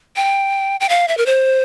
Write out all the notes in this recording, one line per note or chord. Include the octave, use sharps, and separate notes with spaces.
G5
G5
F5
E5
A#4
C5